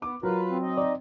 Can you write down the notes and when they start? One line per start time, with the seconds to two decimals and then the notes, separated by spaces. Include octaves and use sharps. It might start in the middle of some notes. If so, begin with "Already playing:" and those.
0.02 B3 D6
0.23 F#3 F4 A#4 B4
0.48 C4
0.62 D#4 D#5
0.77 D5